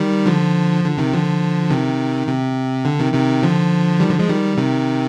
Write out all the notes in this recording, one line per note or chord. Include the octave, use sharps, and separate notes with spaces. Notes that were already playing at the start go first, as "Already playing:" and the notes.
Already playing: D#3 G3
D3 F3
D3
C3 D#3
D3 F3
C3 D#3
C3
D3
C3 D#3
C3 D#3
D3 F3
D#3 G3
D3 F3
F3 G#3
D#3 G3
C3 D#3